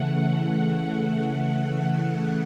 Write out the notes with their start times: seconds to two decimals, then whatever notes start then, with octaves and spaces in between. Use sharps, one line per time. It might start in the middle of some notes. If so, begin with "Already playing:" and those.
Already playing: C#3 E3 A3 F#5